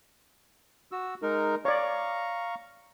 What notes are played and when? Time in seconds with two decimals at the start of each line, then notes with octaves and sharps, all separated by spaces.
0.92 F#4 E6
1.22 G#3 D#4 A#4
1.65 C#5 D5 F5 A#5 C#6